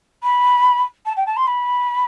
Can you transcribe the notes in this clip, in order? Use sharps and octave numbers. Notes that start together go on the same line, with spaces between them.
B5
A5
G5
A5
C6
B5